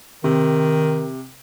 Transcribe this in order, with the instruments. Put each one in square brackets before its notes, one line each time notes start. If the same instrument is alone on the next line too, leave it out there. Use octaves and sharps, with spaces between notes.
[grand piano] C3 [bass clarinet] D#3